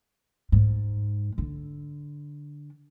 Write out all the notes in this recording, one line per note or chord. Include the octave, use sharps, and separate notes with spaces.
G#2
D3